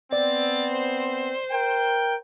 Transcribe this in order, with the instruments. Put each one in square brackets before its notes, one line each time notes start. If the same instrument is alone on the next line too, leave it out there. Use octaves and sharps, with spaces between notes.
[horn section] B3 C4 [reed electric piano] D5 [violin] A6
[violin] C5
[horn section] A#4 G5